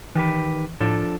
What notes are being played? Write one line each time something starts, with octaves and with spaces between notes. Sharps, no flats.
D#3 E3 G4 B4
A2 F3 D4 A4